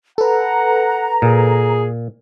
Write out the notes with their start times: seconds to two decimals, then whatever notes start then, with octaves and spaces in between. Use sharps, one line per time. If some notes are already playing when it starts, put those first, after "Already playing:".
0.18 A4 B4 F#5 A#5
1.22 A#2 G#4